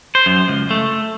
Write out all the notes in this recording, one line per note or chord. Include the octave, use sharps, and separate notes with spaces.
C5
F#2
C#2
A3